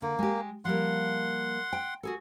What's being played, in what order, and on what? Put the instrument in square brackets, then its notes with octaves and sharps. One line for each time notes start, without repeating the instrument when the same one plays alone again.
[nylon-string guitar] D3 [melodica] A#3
[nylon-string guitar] G#3 G4
[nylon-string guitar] F3 G3 A#3 [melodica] F#5 C6
[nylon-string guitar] G5
F#4 G#4 A4